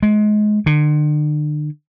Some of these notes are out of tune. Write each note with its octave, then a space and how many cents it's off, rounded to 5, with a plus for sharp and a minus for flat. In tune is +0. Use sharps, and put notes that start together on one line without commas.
G#3 +25
D3 +40